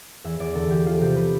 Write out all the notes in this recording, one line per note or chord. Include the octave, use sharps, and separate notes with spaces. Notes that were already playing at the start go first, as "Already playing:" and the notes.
E2 E5
E2 D5
D3 A4
E2 G4
F3 F4
C3 G4
F3 B4